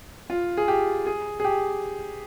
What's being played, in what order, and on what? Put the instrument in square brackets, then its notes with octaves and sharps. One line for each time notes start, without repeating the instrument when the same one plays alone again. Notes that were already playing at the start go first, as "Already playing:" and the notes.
[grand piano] F4
G#4
G4
G#4
G#4
G4